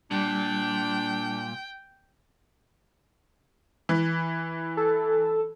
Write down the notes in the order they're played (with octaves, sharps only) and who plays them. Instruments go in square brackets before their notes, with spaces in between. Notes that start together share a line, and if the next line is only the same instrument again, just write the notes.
[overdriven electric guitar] A#2 [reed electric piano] G3 [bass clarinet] D4 [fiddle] G5
[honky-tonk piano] E3
[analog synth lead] A4